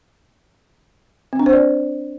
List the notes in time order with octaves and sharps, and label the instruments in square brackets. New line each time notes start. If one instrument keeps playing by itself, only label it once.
[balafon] C4
D4
C5
D5